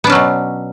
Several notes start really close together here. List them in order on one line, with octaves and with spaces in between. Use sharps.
B3 D4 C#4 F#3 B2